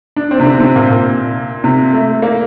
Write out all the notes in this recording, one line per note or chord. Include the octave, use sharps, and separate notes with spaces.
D4
C4
C3
D3
C3
A#2
A#2
C3
A3
A#3